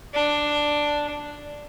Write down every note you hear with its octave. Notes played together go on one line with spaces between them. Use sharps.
D4